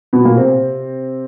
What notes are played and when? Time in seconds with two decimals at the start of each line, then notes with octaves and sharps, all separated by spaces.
0.13 B2 B3
0.25 A#2 A#3
0.36 C3 C4